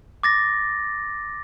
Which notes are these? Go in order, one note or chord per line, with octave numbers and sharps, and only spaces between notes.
D6 A6 A#6